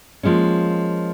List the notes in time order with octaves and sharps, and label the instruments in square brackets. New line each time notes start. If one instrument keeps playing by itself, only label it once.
[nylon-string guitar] F3 G#3 A#3 C#4